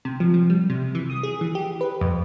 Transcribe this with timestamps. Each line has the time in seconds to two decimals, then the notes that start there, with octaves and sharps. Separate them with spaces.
0.05 C3
0.20 F3
0.34 F3
0.50 G3
0.70 C3
0.95 E3
1.10 D#6
1.23 G#4
1.41 E3
1.55 G4
1.81 B4
2.01 F2